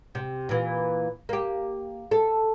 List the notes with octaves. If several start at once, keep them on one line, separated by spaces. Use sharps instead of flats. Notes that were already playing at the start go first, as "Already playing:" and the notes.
C3
A#2 E3
A#3 G4
A4